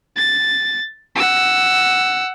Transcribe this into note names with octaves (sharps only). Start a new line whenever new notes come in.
A6
F#5 E6